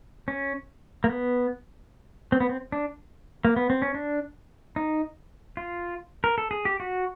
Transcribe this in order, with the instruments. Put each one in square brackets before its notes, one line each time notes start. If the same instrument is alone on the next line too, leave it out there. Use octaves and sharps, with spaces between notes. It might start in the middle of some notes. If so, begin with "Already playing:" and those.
[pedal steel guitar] C#4
A#3
B3
C4
B3
C4
D4
A#3
B3
C4
C#4
D4
D#4
F4
A#4
A4
G#4
G4
F#4